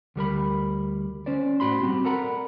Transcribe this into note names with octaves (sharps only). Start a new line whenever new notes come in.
D2 G3 A#4 B5
C#4 C5 D5
A2 F#4 B5 C6
G3 C4 F#4
A4 A#4 D5 F#5 A#5 B5